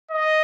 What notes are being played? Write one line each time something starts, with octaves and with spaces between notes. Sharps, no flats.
D#5